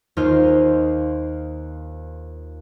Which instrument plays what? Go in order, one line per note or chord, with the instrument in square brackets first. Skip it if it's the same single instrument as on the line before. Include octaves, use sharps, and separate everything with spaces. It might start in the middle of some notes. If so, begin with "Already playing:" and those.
[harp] D#2 D#4 F4 C5 F6